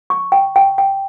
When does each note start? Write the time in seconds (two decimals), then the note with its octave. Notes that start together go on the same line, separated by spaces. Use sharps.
0.10 C#6
0.32 G5
0.56 G5
0.78 G5